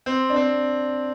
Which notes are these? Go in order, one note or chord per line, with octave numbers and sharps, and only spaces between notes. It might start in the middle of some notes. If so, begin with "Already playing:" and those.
C4
D4
C4